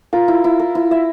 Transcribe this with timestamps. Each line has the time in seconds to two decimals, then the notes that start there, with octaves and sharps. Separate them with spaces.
0.13 F4 A#4
0.28 E4
0.44 E4
0.59 A#4
0.75 E4
0.91 E5